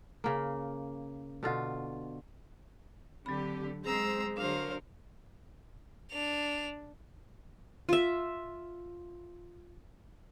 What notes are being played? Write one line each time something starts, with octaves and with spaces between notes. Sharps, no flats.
C#3 A#3
B2 D3 F4
D3 F#3 C4 G4 B5
G#3 C4 G#4 C5 A#5 E6
D3 F#3 D4 A#4 C5 F5
D4 F7
F4 E5